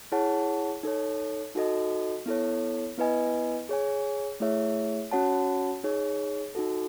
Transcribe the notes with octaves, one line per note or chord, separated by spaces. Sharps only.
E4 G#4 C#5 F#5 A5
D#4 A4 C#5
D#4 F#4 A4 D#5
B3 E4 A4 C#5
B3 E4 B4 D#5 G#5
G#4 C#5 G#5
A3 E4 G#4 C#5 E5
C#4 F#4 C#5 F#5 A5
D#4 G#4 C#5
D#4 F#4 A4